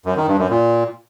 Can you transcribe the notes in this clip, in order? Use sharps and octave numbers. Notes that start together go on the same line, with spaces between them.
F#2
D#3
G2
F#2
A#2